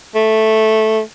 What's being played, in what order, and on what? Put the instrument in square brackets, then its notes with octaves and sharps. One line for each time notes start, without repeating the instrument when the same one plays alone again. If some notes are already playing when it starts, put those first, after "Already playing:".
[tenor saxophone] A3